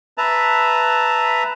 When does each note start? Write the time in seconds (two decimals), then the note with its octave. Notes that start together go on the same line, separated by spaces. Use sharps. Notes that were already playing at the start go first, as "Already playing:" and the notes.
0.18 B4 E5 A5 A#5